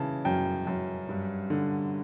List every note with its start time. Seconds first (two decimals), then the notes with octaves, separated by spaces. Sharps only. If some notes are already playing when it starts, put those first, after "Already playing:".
Already playing: C#3 E3 A5
0.25 F#2 G5
0.67 F#2
1.09 G2
1.50 D3